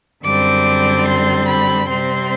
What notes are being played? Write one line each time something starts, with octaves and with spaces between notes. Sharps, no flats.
F#2 D3 G3 C4 D6
C6
B5
C3 G3 C4 C6